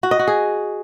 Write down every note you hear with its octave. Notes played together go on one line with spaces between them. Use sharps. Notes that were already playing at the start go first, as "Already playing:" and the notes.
F#4
D#5
F#4
G#4